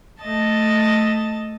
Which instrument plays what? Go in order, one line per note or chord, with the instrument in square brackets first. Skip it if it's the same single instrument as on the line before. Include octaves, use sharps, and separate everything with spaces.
[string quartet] A3 D#5 A5 A6